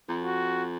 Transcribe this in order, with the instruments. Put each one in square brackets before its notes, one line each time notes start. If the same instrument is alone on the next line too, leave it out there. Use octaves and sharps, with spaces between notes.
[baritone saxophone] F2
[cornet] F#4